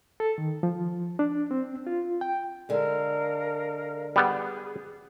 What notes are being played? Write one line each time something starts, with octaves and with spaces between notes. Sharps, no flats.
A4
D#3
F3
D4
C4
F4
G5
D3 G#3 A#4 F5
G3 B3 G#4